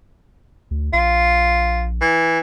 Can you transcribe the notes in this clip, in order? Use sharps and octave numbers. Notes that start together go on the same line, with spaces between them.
D2
A#1 F4
E3